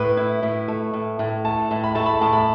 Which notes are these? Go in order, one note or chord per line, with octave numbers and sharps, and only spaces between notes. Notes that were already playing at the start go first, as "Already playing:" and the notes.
Already playing: A2 B4
E4
A2
A3
A2
A2
A3 A5
A2
B5
A3 A5
B5
A2 A5
B5